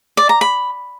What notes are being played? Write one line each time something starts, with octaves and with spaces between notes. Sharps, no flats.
D5
A#5
B5